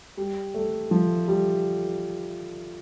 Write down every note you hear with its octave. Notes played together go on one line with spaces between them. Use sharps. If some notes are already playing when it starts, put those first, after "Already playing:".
G3
A3
F3
G3